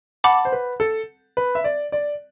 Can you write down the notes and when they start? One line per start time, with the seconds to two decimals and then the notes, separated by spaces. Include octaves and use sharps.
0.24 F#5 A5 B5 D6
0.45 C5
0.52 B4
0.80 A4
1.37 B4
1.55 E5
1.64 D5
1.92 D5